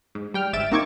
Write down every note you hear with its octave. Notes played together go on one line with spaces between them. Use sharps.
G#2
G3 G5 F6
G1 G#2 E5 A6 D7 E7
A#3 C4 D#4 C#6 D6 G#6